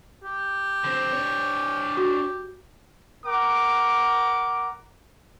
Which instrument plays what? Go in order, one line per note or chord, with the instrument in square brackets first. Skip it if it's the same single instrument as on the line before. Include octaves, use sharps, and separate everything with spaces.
[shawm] G4
[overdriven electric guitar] D3 C4
D4 C#5
[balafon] F#4
[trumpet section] A#4 F#5 D6